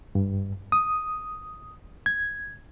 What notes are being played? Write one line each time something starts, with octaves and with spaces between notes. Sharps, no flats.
G2
D#6
G#6